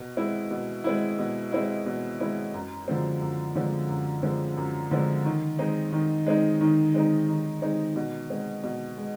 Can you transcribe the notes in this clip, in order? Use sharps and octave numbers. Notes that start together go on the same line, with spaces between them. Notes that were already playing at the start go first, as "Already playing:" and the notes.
Already playing: B2
G#3 C4 E4
B2
G#3 C4 E4
B2
G#3 C4 E4
B2
G#3 C4 E4
F#2
D3 F3 G#3 C4
F#2
D3 F3 G#3 C4
F#2
D3 F3 G#3 C4
F#2
D3 F3 G#3 C4
D#3
G#3 C4 D#4
D#3
G#3 C4 D#4
D#3
G#3 C4 D#4
D#3
G#3 C4 D#4
B2
G#3 C4
B2
G#3